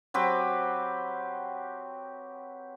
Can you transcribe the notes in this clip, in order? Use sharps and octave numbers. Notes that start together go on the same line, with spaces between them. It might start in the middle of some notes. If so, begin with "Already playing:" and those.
F#3 C4 G4 B4